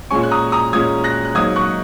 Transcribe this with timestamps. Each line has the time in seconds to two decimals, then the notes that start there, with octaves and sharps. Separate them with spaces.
0.11 A#2 G#3 C#4 G#5 C#6
0.23 F#6
0.31 A#5 D#6
0.52 A#5 D#6
0.73 A#2 G#3 C#4 D#6 G#6
1.04 F#6 A#6
1.25 F#6
1.35 G#2 F#3 A#3 D#6 G#6
1.56 C#6 F#6